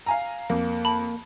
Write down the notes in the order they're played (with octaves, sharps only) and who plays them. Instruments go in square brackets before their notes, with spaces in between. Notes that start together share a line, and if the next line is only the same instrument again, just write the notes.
[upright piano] F5 G#5 A#5
[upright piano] F2 [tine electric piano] A#3
[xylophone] A5 B5